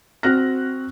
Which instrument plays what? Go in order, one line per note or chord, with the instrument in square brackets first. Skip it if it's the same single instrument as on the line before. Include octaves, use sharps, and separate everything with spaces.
[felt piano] C4 F#4 F6 F#6 A#6